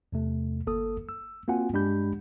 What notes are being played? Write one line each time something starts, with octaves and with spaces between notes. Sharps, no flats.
E2 C3 A3
G1 A#3 A4 D#6
E6
A#3 C4 F4 F#4 F#5 G#5
G2 G#3 D4 G4 B5 G6